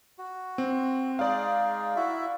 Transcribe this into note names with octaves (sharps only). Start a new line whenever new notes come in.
F#4
C4
G#3 D#4 G#4 D5 F5
E4 F#4 E5